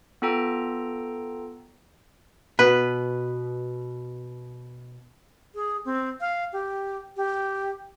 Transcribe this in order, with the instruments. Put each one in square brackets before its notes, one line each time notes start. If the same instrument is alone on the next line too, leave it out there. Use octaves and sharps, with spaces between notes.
[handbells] B3 F4 A4 G5 A#5
[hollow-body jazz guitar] B2 [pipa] B4
[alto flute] G#4
C4
F5
G4
G4